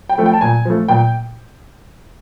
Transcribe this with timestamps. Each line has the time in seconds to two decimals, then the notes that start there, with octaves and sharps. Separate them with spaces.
0.09 G5
0.18 F3 A3
0.26 G5
0.33 A5
0.41 A#2 G#5
0.65 F3 A3
0.88 A#2 G5